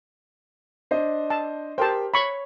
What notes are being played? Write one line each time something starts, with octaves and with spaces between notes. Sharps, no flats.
D4 C5 D#5
A5
G4 A#4 C5 G5 A5
C#5 B5 C#6